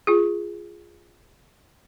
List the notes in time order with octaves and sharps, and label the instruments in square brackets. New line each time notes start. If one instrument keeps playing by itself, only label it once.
[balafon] F4 G#4